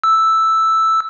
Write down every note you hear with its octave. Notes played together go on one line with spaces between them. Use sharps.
E6